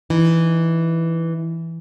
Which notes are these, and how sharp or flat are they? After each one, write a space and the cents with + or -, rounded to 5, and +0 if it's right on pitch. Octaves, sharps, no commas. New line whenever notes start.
E3 +0 D#4 -15